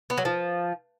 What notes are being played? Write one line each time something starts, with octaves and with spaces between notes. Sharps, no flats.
B3
F#3
F3